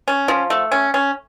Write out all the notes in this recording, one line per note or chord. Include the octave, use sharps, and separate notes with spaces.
C#4
F3
A3
C#4
C#4